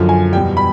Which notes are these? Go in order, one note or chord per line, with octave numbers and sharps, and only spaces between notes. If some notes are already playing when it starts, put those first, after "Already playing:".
Already playing: F#2 D3 F3
G#5
E2 B2 G3 G5
B5